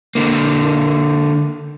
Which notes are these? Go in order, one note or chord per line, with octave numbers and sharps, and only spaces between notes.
D3 A#3